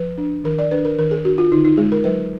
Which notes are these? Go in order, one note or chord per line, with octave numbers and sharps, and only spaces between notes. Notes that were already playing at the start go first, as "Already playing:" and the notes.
Already playing: F3 B4
D4
D#3 A#4
D5
D4 B4
A#4
D#3 A#4
G#4
D4 F#4
F4
D3 D#4
D#4
G#3 G#4
A#4
F#3 B4